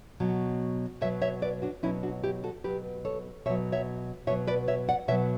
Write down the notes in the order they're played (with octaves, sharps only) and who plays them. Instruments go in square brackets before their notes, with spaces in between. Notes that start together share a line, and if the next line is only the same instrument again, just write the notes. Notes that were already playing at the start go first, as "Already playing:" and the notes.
[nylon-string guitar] B2 F#3
B2 F#3 C#5 E5
C#5 E5
B4 D5
D4 F#4
B2 F#3 C#4 E4
D4 F#4
E4 G4
F#4 A4
B2 F#3 G4 B4
A4 C#5
B2 C#5 E5
F#3
C#5 E5
B2 C#5 E5
F#3
B4 D5
C#5 E5
D5 F#5
B2 F#3 C#5 E5